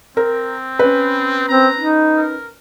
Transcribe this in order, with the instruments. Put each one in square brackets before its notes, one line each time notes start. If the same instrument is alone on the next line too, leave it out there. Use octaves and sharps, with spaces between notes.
[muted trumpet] C4 [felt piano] A#4
[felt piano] C#4 B4
[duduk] C4 [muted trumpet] A#5
[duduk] D#4
[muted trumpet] A#4